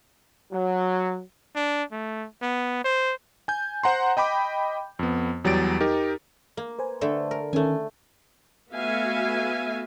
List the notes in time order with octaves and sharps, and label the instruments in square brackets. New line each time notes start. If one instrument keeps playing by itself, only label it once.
[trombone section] F#3
[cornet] D4
A3
B3
C5
[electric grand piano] G#5 G6
C5 F#5 A#5 C6
D#5 G5 B5 D6
F2 B3
E2 F#3 G3 G4 A6 D7
D#4 G4 A#4
[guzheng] A#3
[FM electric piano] B4 C5 G#5
[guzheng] D3 A3 A4
A#4
[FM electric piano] D#3 C#4 A#4 [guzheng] A3 G#5
[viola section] A3 B3 F#4 E5 F5 G#5